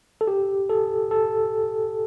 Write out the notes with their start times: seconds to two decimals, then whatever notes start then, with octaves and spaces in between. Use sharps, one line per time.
0.21 A4
0.27 G4
0.70 A4
1.11 A4